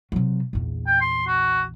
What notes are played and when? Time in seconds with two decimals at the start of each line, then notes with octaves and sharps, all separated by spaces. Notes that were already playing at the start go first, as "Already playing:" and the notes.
0.12 C3 F#3
0.53 A#1 E2
0.87 G5
1.01 C6
1.27 F#4